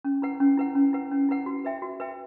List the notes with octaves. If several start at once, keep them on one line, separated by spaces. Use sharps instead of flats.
C#4
E4 B4 F#5
C#4
E4 B4 F#5
C#4
E4 B4 F#5
C#4
E4 B4 F#5
F#4
B4 E5 G5
F#4
B4 E5 G5